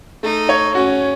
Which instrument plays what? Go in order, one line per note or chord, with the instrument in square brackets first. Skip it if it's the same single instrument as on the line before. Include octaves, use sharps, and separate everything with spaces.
[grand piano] A3 [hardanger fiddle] D#4
[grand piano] C#5
[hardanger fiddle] C#4 [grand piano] F#4